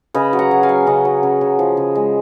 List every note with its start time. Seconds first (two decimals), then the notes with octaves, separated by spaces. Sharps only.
0.14 C#3 B4 D#5
0.33 F#3
0.39 F#5 A#5
0.51 F#3
0.63 F5 G#5
0.69 F#3
0.87 C#3 D#5 F#5
1.05 F#3
1.23 C#3
1.41 C#3
1.59 F3
1.77 C#3
1.95 G#3